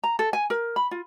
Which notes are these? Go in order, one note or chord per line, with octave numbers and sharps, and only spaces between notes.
A#5
A4
G#5
A#4
B5
F4